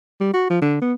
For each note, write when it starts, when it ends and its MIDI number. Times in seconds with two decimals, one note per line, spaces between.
0.21 0.31 55
0.34 0.46 66
0.50 0.59 53
0.62 0.79 50
0.81 0.93 59